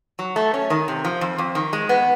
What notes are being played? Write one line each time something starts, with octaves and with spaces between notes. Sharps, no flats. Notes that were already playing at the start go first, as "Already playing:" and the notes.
F#3
A3
C#4
D#3
C3
F3
F2
F2
D#3
G#3
B3